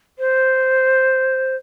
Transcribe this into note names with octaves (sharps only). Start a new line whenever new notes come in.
C5